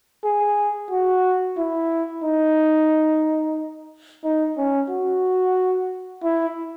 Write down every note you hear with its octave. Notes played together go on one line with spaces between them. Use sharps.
G#4
F#4
E4
D#4
D#4
C#4
F#4
E4